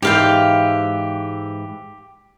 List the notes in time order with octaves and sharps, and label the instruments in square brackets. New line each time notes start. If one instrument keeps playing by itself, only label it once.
[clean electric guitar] G#2 E3 [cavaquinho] G4 F5 G5